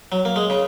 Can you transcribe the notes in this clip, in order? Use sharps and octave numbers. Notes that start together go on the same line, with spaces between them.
F#3
A#3
G#3
C#3